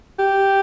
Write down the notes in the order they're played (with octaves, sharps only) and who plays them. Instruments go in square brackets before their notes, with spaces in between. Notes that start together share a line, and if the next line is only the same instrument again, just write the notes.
[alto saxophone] G4